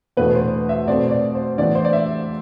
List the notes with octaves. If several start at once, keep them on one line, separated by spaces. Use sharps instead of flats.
E2 B2 A3 D4 B4
C5
E5
B2 A3 C4 D5
D5
C5
A2 E3 B3 D4 D5
C5
D5
E5